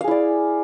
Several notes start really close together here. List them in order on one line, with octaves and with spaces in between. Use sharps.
F5 G#4 E4 D5